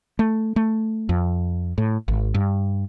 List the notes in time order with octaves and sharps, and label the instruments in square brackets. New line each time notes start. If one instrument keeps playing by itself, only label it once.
[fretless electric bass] A3
A3
F2
A2
G#1
G2